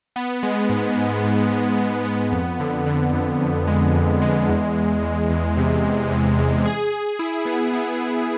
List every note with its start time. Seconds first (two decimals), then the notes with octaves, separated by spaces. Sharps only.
0.16 B3
0.43 G#3
0.69 G#2
0.97 G#2
1.24 G#2
1.51 G#2
1.78 G#3
2.05 B3
2.32 F2
2.60 D3
2.86 D3
3.13 F2
3.40 F2
3.67 G#3
3.94 F2
4.22 G#3
4.49 E2
4.75 E2
5.02 E2
5.30 E2
5.57 C3
5.84 E2
6.11 E2
6.38 E2
6.65 G#4
6.92 G#4
7.19 E4
7.45 B3
7.73 B3
8.01 B3